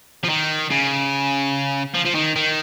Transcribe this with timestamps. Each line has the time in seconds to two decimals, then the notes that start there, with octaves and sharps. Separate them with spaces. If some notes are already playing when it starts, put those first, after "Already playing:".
0.24 F3
0.29 D#3
0.71 C#3
1.94 F3
2.05 F3
2.15 D#3
2.36 D#3